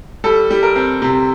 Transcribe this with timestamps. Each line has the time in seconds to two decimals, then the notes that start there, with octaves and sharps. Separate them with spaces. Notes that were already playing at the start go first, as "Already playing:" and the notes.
0.24 G3 A4
0.50 G3
0.63 A#4
0.76 C4
1.02 C3